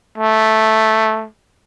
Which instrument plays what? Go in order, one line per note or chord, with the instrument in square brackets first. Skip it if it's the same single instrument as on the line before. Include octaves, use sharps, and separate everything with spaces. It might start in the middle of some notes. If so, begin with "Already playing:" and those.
[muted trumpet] A3